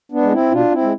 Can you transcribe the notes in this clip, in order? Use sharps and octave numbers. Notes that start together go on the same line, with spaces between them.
B3 D4
G#3
C4 E4
B2 D4 F4
C4 E4
G#3